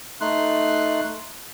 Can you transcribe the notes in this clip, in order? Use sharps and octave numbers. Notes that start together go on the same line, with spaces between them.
A3 D#4 C6 F#6